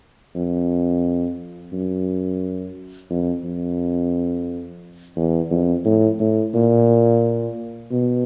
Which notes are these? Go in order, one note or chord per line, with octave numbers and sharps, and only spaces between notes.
F2
F#2
F2
F2
E2
F2
A2
A2
A#2
B2